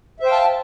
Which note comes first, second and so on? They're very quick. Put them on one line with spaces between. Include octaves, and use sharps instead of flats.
E5 C5 G5 F5 A5